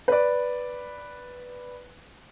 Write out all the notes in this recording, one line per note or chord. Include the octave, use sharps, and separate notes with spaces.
B4 D5